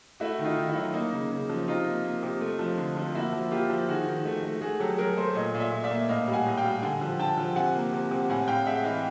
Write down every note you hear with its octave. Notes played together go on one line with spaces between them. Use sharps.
A3 E4 F#4
D#3
D#4 F4
D#3
E4
F#3
A#3 D#4
C#3
C#3
F3
C3 D#4 F4
A#3
A#3
C3
A3
F3
D3
F3
A#3 E4 F#4
F3
A#3 F4 G4
F3
D#3 F#4 G#4
D#3
A3
A3
A3 F#4 G#4
F#3 G4 A4
F#3 G#4 A#4
A3 A#4 C5
A#2 C#5 D#5
A#2
D5 E5
A#2
D5 E5
A#3
A2 D#5 F5
G3
F#5 G#5
A2
F5 G5
G3
D3 F#5 G#5
F3
D3 G5 A5
F3
C3 F#5 G#5
A#3
C3
C3
A2 F#5 G#5
A2 F5 G5
G#3 E5 F#5
E3 D#5 F5